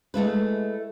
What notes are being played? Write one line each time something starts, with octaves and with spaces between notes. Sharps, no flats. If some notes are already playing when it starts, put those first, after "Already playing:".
G#3 A3 E4 B4